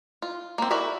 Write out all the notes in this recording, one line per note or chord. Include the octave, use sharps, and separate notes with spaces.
F4
A#3 C4
E4 F#4 A#4 D5 E5